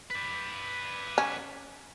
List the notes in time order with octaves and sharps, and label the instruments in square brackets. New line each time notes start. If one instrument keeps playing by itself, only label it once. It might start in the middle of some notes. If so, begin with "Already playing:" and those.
[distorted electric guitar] B4 D5
[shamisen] C#4